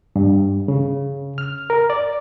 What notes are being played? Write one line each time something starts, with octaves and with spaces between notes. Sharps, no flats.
G2
C#3
F6
A#4
D5